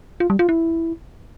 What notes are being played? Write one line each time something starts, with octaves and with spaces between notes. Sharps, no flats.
F4
G3
F4
E4